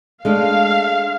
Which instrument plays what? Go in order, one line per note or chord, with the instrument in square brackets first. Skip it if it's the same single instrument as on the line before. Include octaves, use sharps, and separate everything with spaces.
[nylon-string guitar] G#3 A3 D4 [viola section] F5